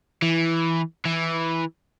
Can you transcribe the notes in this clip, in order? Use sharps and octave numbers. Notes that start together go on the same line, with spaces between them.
E3
E3